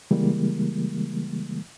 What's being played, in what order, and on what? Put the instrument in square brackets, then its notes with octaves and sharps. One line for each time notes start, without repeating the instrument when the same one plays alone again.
[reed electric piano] C#3 E3 G3 G#3 A#3